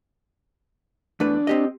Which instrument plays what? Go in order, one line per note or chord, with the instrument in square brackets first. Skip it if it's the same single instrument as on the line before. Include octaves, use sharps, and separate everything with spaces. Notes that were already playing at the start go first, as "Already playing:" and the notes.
[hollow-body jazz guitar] E2 A3 B4 [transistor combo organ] D4
[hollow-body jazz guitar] C4 G4 D#5